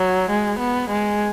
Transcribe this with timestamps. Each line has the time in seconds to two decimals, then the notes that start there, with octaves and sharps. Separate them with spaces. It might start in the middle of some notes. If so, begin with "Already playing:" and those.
Already playing: F#3
0.30 G#3
0.59 B3
0.90 G#3